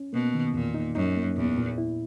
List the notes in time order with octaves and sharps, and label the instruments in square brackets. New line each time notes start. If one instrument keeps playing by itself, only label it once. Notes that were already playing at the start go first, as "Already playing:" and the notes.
Already playing: [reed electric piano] C#4
[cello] B2 [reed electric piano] A#3
[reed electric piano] D#3
[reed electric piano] E2 [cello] A#2
[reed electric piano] D#4
[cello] F#2 [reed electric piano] D#4
[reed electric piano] A#3
[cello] E2 [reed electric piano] A#2
[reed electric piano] A#2
E4